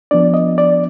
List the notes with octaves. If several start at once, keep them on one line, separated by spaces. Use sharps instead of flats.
F3 B3 D4 D5
D#5
D5